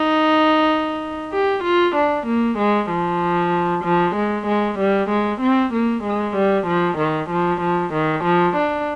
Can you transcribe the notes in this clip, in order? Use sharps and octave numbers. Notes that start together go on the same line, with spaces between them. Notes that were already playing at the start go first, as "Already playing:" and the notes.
Already playing: D#4
G4
F4
D4
A#3
G#3
F3
F3
G#3
G#3
G3
G#3
C4
A#3
G#3
G3
F3
D#3
F3
F3
D#3
F3
D4